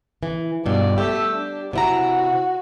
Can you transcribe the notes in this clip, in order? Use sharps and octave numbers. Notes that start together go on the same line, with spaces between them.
E3
G2 B2 D5
A3 G4 E6
D4
C3 E4 F#4 A#5